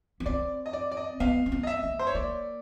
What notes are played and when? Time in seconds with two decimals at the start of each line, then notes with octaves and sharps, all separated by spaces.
0.20 B3
0.26 C4 D5
0.66 D#5
0.73 D5
0.91 D5
0.97 D#5
1.20 B3 F5
1.46 C4
1.52 B3
1.63 D#5
1.67 E5
1.83 A#3
1.99 C5
2.07 C#5
2.14 A#3 D5